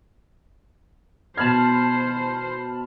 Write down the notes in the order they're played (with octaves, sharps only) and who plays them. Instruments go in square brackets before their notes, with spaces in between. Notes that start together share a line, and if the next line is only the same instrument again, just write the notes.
[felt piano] B2 G#6 [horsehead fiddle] C5 [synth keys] A5 B5 F6